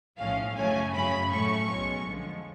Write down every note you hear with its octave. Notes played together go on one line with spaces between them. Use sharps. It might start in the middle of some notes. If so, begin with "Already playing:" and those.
B1 A2 F3 A3 C#4 F5
F#2 C#3 F#3 A3 C#4 G#5
F#2 C#3 F#3 C#4 B5
A2 F#3 A3 C#4 C#6
B1 B2 G#3 C#4
F2 D3 F3 G#3